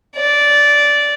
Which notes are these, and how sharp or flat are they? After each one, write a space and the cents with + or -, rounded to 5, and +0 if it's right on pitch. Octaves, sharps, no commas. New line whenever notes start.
D5 -10